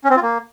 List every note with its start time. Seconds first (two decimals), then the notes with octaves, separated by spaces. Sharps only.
0.04 C#4
0.10 C4
0.16 F4
0.22 A#3